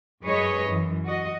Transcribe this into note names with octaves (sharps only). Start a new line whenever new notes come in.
F#2 G#4 B4 C#5 D#5
F#2 E3
F#4 D#5